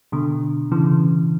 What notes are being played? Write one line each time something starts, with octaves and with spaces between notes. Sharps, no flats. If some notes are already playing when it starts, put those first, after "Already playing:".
B2 D3
C#3 E3